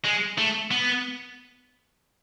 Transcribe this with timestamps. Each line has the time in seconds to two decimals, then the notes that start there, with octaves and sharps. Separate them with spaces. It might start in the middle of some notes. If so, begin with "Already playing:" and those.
0.05 G#3
0.38 A3
0.71 B3